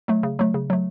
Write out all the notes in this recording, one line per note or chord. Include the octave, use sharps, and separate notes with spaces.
F#3 A3
C#3
F#3 A3
C#3
F#3 A3